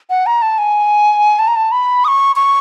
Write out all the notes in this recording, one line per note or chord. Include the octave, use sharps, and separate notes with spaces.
F#5
A#5
A5
G#5
A5
A#5
A5
B5
D#6
C#6
C#6